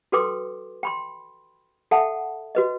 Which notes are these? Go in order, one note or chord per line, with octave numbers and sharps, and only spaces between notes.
F#4 A4 B4 G5 C6 D6
G5 B5 C6
A4 E5 F#5 G5 A5
F#4 B4 D#5